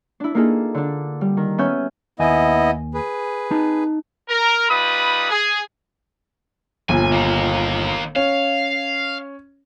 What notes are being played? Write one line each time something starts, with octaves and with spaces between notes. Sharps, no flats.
D4 E4
A#3 D4 D#4 F4 G#4 A4
D3 D4
G3
D#3
B3 C#4 E5 G#5 F6 G6
D#2 B3 E4 D#5 G#5
G#4 B4
D#4 A5
A#4
G3 D#4 F4 B4 B5 D#6
G#4
G1 A#2 G#5
D#3 A#3
C#4 F5